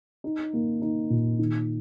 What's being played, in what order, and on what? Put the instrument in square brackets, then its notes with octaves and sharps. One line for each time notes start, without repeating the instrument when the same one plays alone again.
[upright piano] D#4
A#3
D#4
A#2
D#3